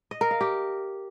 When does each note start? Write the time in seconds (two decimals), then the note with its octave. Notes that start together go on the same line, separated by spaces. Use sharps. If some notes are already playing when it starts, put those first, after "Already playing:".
0.11 D#5
0.21 A#4
0.31 F5
0.41 G4